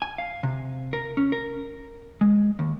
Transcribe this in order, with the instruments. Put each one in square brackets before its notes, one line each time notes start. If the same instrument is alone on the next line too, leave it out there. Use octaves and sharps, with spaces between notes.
[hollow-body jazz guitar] G#5
F5
C3
A#4
C#4
A#4
G#3
D#2